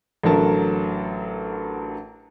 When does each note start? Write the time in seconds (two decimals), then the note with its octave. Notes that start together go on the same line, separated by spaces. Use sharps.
0.23 A1 D3 F#3 A#4 A5